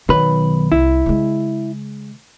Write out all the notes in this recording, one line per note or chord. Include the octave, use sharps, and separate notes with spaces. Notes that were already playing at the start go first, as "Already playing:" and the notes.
B1 D#3 B4
C2 E4
C#3 G#3